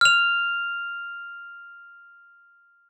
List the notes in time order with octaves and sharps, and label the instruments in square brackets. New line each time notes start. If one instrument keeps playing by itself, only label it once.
[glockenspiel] F6 F7